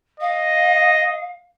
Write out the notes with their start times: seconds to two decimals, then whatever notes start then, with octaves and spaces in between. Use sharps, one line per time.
0.20 D#5 F5